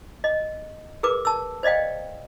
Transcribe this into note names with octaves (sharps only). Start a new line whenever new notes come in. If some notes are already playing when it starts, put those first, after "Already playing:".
D#5
G#4 A#4 B4 D6
A5 E6
C5 D5 D#5 F5 G5